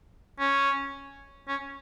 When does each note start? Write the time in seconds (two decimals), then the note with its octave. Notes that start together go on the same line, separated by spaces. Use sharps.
0.40 C#4
1.48 C#4